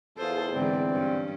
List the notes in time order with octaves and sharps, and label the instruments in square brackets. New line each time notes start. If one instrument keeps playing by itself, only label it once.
[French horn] E2 [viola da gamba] F4 G#4 C5 [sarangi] A4
[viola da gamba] G#2 D3 E3 [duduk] C4 [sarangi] D5
[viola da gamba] G2 C#4